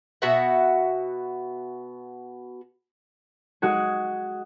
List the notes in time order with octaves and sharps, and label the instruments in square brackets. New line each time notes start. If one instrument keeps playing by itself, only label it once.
[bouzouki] B2 F#4 E5 F#5
[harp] G#3 F#4 G#4